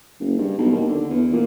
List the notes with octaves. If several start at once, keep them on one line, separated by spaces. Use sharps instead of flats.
F#1
G2
B1
D#2
D3
E2
A#2